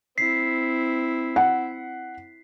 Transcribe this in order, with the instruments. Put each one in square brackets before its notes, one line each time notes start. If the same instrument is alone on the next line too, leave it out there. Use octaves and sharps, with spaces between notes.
[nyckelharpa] C4 E4 [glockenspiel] B6 C7
[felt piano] F#5